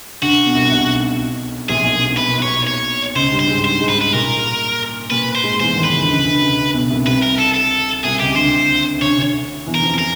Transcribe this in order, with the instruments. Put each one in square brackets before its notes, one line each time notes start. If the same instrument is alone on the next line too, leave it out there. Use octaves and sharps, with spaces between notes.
[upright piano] D2 D3 [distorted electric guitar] F#4
[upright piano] B2
C2 C3
B1 B2
[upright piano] A#1 A#2 [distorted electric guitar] G#4
[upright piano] B1 B2
C2 C3
[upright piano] B2 [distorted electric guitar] B4
[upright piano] A#2
B1 B2
[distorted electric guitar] C#5
C#5
[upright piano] C#2 C#3 [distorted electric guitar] C5
[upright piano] G2 G3
[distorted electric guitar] C5
[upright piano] G#2 G#3
[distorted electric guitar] C5
[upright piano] G#2 G#3
[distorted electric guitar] B4
B4
[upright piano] A#2 A#3 [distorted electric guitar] A#4
[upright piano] A#2 A#3 [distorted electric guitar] B4
[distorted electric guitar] C5
[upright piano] G#2 G#3
[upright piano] E2 E3 [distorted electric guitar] C5
[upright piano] D#2 D#3
[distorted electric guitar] B4
[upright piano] C#2 C#3
D3
C#2 C#3
D2 D3
C#2 C#3
B1 B2
C2 C3
[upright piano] C2 C3 [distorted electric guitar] B4
[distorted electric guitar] A#4
A4
A4
[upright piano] C2 C3 [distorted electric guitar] G#4
[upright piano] C#2 C#3 [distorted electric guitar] G4
[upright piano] D2 D3 [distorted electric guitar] C5
[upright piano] D2 D3 [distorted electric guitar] C#5
[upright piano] D2 D3
E2 E3
[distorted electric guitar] A#4
[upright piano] F2 F3
[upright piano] E3 [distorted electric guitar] A#4